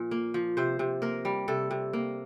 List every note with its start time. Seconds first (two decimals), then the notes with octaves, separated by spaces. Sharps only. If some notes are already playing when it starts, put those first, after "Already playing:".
Already playing: A#2 F3
0.11 A#3
0.34 F3
0.57 C3 C5
0.79 C3
1.02 A#3 A#4
1.25 G3
1.48 C3 A4
1.71 C3
1.93 A#3